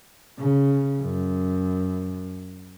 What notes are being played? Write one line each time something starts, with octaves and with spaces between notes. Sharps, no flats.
C#3
F#2